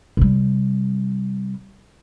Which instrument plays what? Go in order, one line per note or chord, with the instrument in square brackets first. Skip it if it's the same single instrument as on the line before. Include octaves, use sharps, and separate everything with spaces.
[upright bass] C3 G3